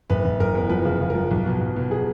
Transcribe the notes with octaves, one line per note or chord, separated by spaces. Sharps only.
F#1 B4
F#1
F#1 A#4
E2
F3 B4
C#3
C#3
A#4
F3
B1
B2
B1
B2
G#4